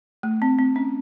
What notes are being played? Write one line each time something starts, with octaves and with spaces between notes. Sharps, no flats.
A3
C4
C4
C#4